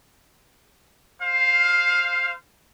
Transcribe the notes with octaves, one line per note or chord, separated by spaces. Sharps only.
C5 F5